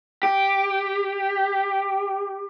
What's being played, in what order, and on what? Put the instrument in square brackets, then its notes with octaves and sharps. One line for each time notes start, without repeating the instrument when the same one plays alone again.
[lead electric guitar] G4